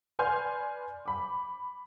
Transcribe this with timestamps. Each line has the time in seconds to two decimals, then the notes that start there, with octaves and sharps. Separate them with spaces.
0.19 B4 D5 G#5 C6 F6 G6
1.06 B5 D6